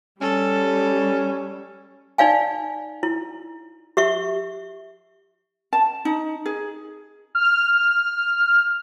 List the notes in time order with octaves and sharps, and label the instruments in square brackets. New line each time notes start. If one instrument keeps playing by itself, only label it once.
[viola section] G3 [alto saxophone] C#4 [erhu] A4
[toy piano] D#4 D5 F5 G#5
E4
G4 E5 C#6
[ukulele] A5
D#4
G#4
[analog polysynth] F6